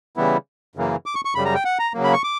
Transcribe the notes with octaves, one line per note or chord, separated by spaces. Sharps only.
C#3 E3 G3 B3 E4
F#2 C#3 E3 A#3
D6
C#6
C#6
F#2 C#3 G3 B5
A#5
G5
F#5
A#5
C#3 F#3 A#3
B5
C#6
D6